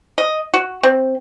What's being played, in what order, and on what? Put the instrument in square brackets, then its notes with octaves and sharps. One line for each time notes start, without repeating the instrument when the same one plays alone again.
[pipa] D#5
F#4
C4